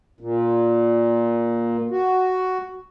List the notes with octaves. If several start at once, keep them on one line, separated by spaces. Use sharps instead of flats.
A#2
F#4